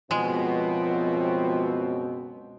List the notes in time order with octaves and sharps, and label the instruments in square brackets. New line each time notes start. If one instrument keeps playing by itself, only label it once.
[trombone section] C#2 F#2 C4 [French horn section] B2 [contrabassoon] F3 [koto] G#3